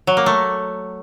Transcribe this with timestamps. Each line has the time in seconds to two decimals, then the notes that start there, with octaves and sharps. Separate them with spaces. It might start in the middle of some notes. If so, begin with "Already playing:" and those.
0.07 F#3
0.17 A#3
0.26 A3